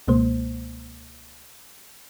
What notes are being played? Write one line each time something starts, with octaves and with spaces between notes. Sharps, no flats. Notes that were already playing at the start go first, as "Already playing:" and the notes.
C#2 B2 G#3 A#3 C5